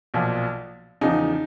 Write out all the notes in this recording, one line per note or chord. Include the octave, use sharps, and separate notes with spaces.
B1 A#2 F3
E2 C#3 F3 D#4